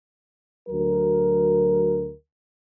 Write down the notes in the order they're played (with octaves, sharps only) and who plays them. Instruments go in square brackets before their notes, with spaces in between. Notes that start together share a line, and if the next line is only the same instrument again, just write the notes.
[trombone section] D2 F#3 A#4